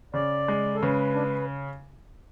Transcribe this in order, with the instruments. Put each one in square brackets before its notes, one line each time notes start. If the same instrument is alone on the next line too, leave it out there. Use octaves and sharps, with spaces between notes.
[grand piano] C#3 [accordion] D5
[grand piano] G#3
[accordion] A4
[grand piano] C#3 [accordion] B4
[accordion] D4